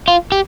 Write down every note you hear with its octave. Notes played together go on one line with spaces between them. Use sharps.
F4
G4